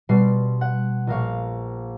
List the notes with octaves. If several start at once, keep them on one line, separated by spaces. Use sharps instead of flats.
B2 G3 C6 C7
F#5
A#1 A#4 F5 C#6